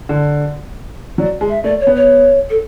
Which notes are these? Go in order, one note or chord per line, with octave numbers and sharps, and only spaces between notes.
D3
F#3 D5
G#3
E5
A3 D5
C#5
B3
C#5
A4